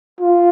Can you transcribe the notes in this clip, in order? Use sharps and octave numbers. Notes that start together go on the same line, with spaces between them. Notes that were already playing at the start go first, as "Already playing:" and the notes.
F4